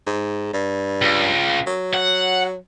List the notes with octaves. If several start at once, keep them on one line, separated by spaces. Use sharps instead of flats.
G#2
G2
C#2
F#3
F#5